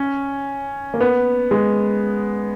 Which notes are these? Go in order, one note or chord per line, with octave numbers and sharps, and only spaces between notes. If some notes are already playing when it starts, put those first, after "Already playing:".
Already playing: C#4
A#3
B3
G#3